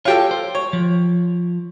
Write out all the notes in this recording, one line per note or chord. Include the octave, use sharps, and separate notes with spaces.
F4 G4 A4 C#5 G5
C5
C#5
F3